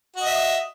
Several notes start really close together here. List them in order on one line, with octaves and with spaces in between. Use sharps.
F#4 D#5 E5